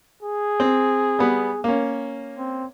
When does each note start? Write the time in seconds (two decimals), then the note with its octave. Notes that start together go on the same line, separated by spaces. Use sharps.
0.23 G#4
0.60 C4
1.19 G3 B3
1.64 A#3 C#4
2.38 C4